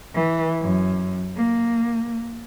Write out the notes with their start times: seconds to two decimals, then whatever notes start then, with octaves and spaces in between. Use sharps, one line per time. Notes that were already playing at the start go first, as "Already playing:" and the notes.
0.14 E3
0.62 F#2
1.36 A#3